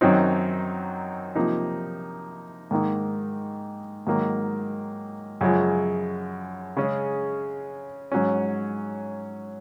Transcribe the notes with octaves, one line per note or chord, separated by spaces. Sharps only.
F#2 D#3 F#3 C4 D#4
C3 F3 A#3 D#4
G#2 D#3 A#3 D#4
G#2 D#3 F#3 A#3
F#2 C#3 F3 G#3
C#3 G#3 C#4
G#2 F#3 C#4